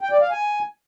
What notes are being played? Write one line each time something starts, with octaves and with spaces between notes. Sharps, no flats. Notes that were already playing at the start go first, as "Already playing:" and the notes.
G5
D5
F5
G#5